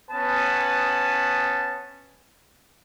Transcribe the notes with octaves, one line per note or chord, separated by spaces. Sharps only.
B3 C#4 B4 A5